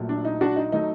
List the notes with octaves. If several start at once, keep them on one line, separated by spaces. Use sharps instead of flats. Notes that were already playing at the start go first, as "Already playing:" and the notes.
Already playing: A#1 A#2 F#3 A3
D4
D#4
D4 F#4
D#4
F#3 A3 D#4